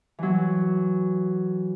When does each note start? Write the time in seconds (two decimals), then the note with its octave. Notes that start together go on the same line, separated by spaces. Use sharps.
0.19 E3 F#3